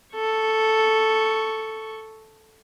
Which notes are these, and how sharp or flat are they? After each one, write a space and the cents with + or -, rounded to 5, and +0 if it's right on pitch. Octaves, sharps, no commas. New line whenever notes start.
A4 +0 C#6 +0